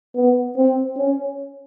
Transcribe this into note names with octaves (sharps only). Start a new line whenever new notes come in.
B3
C4
C#4